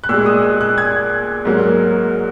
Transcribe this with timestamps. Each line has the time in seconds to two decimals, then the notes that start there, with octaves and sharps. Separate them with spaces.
0.04 F#6
0.09 A#2 G#3 E6
0.26 D#6
0.42 E6
0.61 F#6
0.78 G#6
1.45 G#2 F#3 A#3